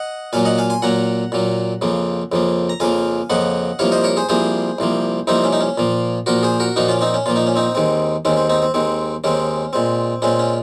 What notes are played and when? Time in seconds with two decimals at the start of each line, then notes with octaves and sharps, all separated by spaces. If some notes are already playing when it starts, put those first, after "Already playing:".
Already playing: D#5 F#5
0.33 A#2 F#3 A#3 F5 G#5
0.45 D#5 F#5
0.58 F5 G#5
0.70 G#5 C6
0.82 A#2 F#3 A#3 F#5 A#5
1.32 A#2 F#3 A#3
1.81 F2 C#3 F3 A#3
2.32 F2 C#3 F3 A#3
2.69 A#5
2.80 F2 C#3 F3 A#3 F5 G#5
3.30 F2 C#3 F3 A#3 D#5 F#5
3.79 C2 C3 F3 A#3 C#5 F5
3.92 C5 D#5
4.04 A#4 C#5
4.17 G#4 C5
4.29 C2 C3 F3 A#3 G#4 C5
4.79 C2 C3 F3 A#3
5.27 C2 C3 F3 A#3 C4 D#4
5.44 C#4
5.53 D#4
5.61 C#4
5.78 A#2 F3 A#3
6.26 A#2 F3 A#3 F#4 A#4
6.43 G#4 C5
6.60 F#4 A#4
6.76 A#2 F3 A#3 D#4 F#4
6.88 C#4 F4
7.01 C4 D#4
7.14 C#4
7.26 A#2 F3 A#3 F4
7.36 D#4
7.47 C#4
7.56 C4 D#4
7.75 D#2 D#3 G#3 C4
8.25 D#2 D#3 G#3 C4 C#4
8.37 C4
8.49 C4 D#4
8.62 C4
8.74 D#2 D#3 G#3 C4
9.24 D#2 D#3 G#3 C4 C#4
9.73 A#2 G#3 C4
10.22 A#2 G#3 C4 C#4
10.39 C#4